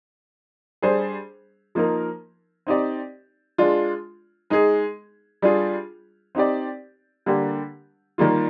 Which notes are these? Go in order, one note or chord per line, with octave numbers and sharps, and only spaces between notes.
G3 D4 G#4 C5
F3 A#3 D#4 A#4
C4 D#4 G4 D5
G#3 D4 F4
G#3 D#4 G#4
G3 D4 F4 G#4
C4 D#4 G4 D5
D3 G3 A#3 D4 G4
D#3 G3 A#3 F4